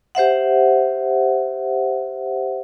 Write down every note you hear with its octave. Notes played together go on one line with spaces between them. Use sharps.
G4 C5 E5 F#5